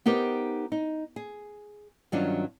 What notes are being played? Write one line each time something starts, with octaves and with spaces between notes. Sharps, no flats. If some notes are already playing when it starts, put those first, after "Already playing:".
B3 D#4 G4 A#4 C5
D#4
G#4
G2 D#3 F#3 C#4 D4 F4